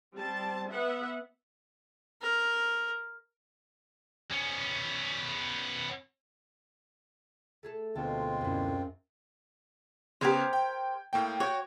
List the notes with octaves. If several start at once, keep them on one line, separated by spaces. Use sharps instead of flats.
G3 C4 A5
B3 E5 F#5
A#4
B3 C#4
A3 G#4 A4
D2 B2 G#3 C4 F4 A4
F#2 D3 E4
C#3 B3 G4 A#4 C5 G#6
G5
A2 A#3 G5
F#4 C#5 G5